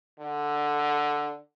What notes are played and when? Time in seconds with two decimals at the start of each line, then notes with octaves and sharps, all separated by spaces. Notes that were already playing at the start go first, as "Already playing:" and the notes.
0.19 D3